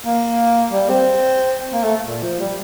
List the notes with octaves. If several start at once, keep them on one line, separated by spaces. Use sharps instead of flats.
A#3
G3
C4
A#3
A3
A#2
F3
G3